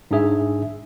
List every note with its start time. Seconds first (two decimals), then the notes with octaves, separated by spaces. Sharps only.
0.11 G#2 D4 G#4 E5